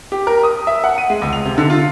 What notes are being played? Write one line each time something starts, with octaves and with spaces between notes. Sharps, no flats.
G4
A#4
D#6
E5
F#5
D#7
G#3
C#2
F7
C3
D3
F4